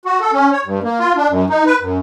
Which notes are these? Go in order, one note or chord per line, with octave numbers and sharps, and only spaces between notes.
F#4
A4
C#4
C#5
G2
A#3
F4
D4
F#2
D#4
B4
F#2